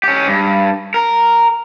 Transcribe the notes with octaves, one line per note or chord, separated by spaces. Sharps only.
C#4 G4
G2
A#4